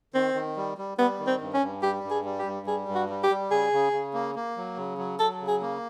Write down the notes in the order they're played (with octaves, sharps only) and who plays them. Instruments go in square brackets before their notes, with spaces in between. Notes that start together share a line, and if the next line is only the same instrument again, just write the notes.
[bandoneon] D#3 [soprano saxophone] C4
[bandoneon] D#3
G3
G3
[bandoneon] G3 [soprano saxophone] B3
[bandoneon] D#3
[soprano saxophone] C4
[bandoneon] G2
[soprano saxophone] C#4
[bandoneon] G2
[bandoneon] G3 [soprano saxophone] G4
[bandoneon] G2
[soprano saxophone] G#4
[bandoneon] G3
[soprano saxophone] G4
[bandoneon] G2
[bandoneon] G3 [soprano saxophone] G#4
[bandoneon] G2
[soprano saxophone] F#4
[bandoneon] G3
[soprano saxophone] G4
[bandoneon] G3
[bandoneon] C#3 [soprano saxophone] G#4
[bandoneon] C#3
C#3
A#3
A#3
F#3
C#3
F#3
[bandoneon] F#3 [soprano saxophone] A4
[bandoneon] C#3
[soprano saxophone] G#4
[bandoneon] A#3